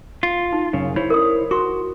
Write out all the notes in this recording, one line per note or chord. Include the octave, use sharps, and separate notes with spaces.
F4
D#4
F#2 C#3
E4 C5 C#5
A#4 D5 D#6
F#4 A#4 C6 C#6